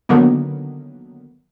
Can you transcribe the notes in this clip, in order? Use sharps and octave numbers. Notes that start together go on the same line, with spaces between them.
D3 D#3 F#3 A#3 B3